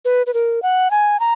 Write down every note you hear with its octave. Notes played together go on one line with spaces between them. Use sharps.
B4
B4
A#4
F#5
G#5
A#5